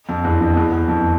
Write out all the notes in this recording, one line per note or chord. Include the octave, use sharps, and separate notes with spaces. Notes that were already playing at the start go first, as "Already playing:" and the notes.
F2
E2
F2
E2
E2
F2